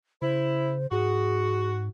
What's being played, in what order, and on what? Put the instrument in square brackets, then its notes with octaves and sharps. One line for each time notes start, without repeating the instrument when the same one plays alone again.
[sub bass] C#3 [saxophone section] E4 [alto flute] C5
[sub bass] G#2 [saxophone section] F#4 [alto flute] G#4